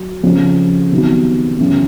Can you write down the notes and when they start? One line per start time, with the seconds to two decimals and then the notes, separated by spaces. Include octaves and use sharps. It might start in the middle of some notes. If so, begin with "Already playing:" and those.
Already playing: F#3
0.23 F2 C#3 F3
0.91 C3 D#3 F#3 B3
1.58 F#2 C#3 E3